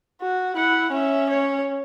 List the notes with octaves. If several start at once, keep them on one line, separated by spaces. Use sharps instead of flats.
F#4
E4 F#5
C#4 E5
C#5